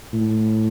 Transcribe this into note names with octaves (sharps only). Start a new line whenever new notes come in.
A2